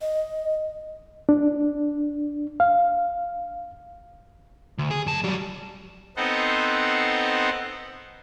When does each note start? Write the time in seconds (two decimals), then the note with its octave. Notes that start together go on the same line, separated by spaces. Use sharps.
0.01 D#5
1.29 D4
2.60 F5
4.78 D2
4.91 G#4
5.06 F#2 A5
5.24 F#3 G3
6.17 B3 C4 D#4 A4 C5 F#5